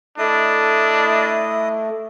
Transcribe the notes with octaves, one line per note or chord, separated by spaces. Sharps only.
A3 D4 E4 D#5 D#6